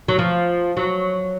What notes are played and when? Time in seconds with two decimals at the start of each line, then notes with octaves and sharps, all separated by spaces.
0.08 F#3
0.19 F3
0.77 F#3